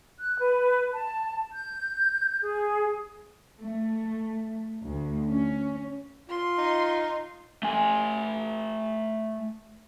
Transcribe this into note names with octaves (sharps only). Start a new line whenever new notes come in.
F#6
B4
A5
G6
G#4
A3
D2
C#4
F4 C6
D#4
A3 G#5